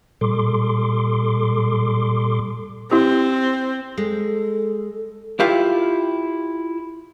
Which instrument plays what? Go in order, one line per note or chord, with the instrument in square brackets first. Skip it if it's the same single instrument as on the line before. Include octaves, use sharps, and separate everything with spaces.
[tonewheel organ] A#2 G3 A4 C6 D6
[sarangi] C4 [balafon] E4 G4
[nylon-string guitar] G#3 [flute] A4
[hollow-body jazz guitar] E4 F4 G4 E5 F5